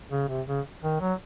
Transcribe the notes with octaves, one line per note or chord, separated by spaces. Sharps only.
C#3
C3
C#3
D#3
F#3